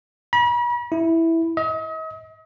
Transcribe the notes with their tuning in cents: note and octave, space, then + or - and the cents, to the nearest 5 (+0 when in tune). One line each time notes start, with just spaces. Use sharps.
B5 -45
E4 -5
D#5 +40